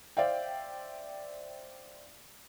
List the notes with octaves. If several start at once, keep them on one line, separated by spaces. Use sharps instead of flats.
C5 D5 E5 F5 G5